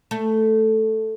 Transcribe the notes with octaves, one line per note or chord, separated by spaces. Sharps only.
A3